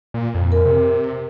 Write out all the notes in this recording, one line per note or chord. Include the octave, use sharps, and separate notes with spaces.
A#2
F2
A#4
C3